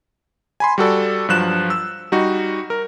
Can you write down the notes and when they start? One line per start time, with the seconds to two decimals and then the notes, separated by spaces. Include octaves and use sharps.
0.60 G#5 B5 C6
0.78 G3 F#4 A4 D5
1.29 G2 F3 F#3 F#6 E7
1.70 E6
2.12 G3 D#4 F#4
2.70 A#4